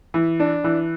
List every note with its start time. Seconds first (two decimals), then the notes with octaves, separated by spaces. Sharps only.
0.14 E3
0.40 D4
0.64 E3